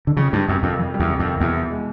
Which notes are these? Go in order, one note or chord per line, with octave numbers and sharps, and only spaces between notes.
D3
F2 C#3
G2 G3
F#2 C3
F2 D#3
F2
G3
E2
C3
F2
D#3
E2 B2
E4
G#3